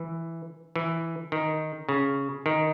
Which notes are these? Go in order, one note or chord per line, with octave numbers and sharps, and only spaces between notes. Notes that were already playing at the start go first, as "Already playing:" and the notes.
Already playing: E3
E3
D#3
C#3
D#3